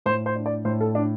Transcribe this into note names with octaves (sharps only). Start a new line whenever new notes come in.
A2 C5
C5
D4
D5
A2 C5
A4
D4